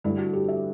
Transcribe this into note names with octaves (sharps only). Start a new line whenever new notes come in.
G2 D3 A3 E4
F#4
G4
E5